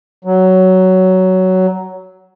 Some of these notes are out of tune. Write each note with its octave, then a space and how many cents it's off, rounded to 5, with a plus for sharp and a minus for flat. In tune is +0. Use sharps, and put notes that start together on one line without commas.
F#3 +10